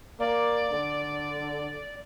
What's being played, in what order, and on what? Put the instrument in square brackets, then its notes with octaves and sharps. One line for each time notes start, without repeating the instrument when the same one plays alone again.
[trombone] A#3 [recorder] D5
[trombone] D3